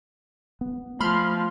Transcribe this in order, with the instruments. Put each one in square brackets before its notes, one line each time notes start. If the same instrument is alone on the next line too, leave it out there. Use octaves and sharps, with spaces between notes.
[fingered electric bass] B3
[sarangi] F3 [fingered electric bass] A3 [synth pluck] B5 C6 F6